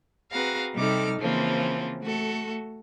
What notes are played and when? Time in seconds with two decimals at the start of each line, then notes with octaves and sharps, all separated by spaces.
0.31 C4 F#4 G#4 B4 F5 A#5
0.76 C3 G3 D#4 A4 D6 F6
1.21 C#3 E3 F3 A#3 C4
2.03 A3 F#4 A4